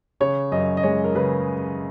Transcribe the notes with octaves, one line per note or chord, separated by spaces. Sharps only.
C#3 C#5
F#2 D#5
D#5
G#3 C#5
A#4
C#3 B4